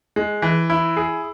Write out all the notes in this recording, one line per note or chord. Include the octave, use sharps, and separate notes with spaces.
G#3
E3
E4
G#4